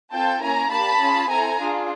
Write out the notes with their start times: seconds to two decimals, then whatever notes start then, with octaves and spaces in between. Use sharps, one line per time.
0.11 C4 F4 A4 G5 A5
0.41 A#3 C#4 E4 G#5 A#5
0.70 A#3 D4 G4 A5 B5
0.99 C#4 F4 G#4
1.29 C4 E4 A4 G#5 A#5
1.59 D4 F4 G#4